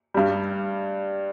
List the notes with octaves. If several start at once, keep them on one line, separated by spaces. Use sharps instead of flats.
G2 G3